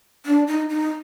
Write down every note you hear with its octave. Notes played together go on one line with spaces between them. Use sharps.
D4
D#4
D#4